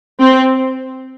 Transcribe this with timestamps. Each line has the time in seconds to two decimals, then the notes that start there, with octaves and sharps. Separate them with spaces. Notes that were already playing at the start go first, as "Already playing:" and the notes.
0.20 C4